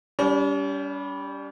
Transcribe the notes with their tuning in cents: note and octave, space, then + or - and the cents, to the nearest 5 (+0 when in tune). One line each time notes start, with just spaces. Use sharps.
G3 +0 C#4 +45